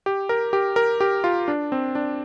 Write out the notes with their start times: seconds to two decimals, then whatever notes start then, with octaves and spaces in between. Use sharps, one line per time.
0.06 G4
0.29 A#4
0.53 G4
0.76 A#4
1.00 G4
1.24 F4
1.48 D4
1.72 C4
1.95 D4